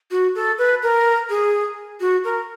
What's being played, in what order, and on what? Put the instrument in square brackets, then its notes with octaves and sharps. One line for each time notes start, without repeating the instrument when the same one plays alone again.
[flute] F#4
A4
B4
A#4
G#4
F#4
A#4